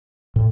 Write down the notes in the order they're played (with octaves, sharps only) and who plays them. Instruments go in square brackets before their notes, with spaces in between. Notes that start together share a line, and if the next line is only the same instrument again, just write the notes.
[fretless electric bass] A2